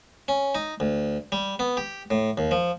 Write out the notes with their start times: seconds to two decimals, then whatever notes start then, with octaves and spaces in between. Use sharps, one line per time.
0.28 C#4
0.55 D#4
0.80 D2
1.32 G3
1.59 B3
1.77 G4
2.11 A2
2.38 D#2
2.51 F3